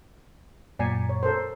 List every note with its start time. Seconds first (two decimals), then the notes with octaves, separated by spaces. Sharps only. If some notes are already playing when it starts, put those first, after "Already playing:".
0.79 F#2 A#2 D5 G#5
1.09 C#5
1.23 A4 A#4 C5